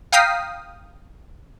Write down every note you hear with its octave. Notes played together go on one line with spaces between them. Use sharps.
F5 G5 A#5 D#6 B6 C7